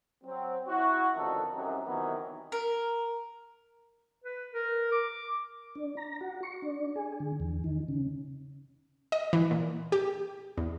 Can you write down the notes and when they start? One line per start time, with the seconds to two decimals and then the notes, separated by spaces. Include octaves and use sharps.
0.24 F#3 C4
0.68 E4 F#4
1.15 A1 F2 D3 D#3 D#4 A4
1.55 C2 F#2 C3 F#3 D#4
1.86 C3 D#3 E3 F#3 B3
2.52 A#4
4.24 B4
4.54 A#4
4.92 D6
5.75 D4
5.97 A#5
6.21 F#4
6.43 C#6
6.62 D4
6.96 G#4
7.20 D3
7.40 E2
7.64 D#3
7.88 C#3
9.12 D#5
9.33 E3
9.51 A#2
9.92 G4
10.57 E2